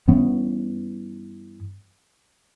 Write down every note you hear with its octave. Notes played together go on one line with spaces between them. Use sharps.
G2 E3 B3 C#4